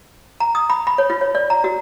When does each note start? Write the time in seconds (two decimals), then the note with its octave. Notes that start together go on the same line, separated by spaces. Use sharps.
0.40 A#5
0.55 D#6
0.70 B5
0.87 B5
0.98 C#5
1.10 F4
1.21 C#5
1.35 D5
1.50 A#5
1.64 F#4